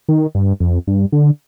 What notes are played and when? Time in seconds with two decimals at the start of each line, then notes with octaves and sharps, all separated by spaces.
0.09 D#3
0.35 G2
0.60 F2
0.87 G2
1.12 D3